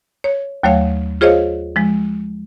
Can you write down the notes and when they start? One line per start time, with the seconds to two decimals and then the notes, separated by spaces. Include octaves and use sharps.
0.24 C#5
0.63 D#2 F#3 A3 C#5 F5
1.21 F4 G#4 C5 C#5 D#5 F5
1.76 F3 G#3